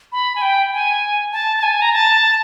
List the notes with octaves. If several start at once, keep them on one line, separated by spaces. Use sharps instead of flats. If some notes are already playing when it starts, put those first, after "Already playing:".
B5
G#5
G5
G#5
A5
A5
G#5
A#5
A5